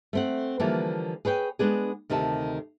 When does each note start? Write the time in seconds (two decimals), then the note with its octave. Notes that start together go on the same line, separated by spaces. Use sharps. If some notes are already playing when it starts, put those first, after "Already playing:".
0.13 A3 C4 F#5
0.60 D3 E3 F3 G3 A#3
1.25 G#4 B4 C#5 G5
1.59 G#3 B3 D4 G#4
2.10 D2 C3 D#3 A4 A5